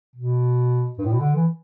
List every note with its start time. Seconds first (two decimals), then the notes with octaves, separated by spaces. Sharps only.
0.16 B2
0.98 G2
1.05 A2
1.12 B2
1.21 D3
1.35 E3